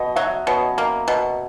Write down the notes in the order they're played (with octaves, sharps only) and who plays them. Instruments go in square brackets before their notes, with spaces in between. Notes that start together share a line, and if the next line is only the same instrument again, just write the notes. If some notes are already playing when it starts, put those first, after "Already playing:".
Already playing: [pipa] B2 [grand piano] D#5
[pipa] F#3 [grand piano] E5
[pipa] B2 [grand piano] C#5
[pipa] A#3
B2